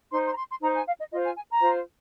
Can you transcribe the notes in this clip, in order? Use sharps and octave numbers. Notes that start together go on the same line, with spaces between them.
D#4 C5 C6
C6
A#5
C6
C6
D#4 C5 A#5
G#5
F5
D#5
F4 C5 D#5
G#5
G#5
A#5
F4 C5